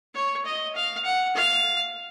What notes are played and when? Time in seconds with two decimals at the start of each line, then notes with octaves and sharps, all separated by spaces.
0.14 C#5
0.45 D#5
0.75 F5
1.05 F#5
1.35 F5